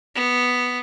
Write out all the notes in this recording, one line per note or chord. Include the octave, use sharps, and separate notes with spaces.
B3